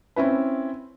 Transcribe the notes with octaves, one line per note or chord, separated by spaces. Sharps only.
C4 C#4 E4 B4